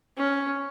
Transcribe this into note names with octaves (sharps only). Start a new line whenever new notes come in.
C#4